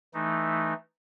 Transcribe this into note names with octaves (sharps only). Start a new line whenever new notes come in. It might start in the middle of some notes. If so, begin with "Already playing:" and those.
E3 A3 D#4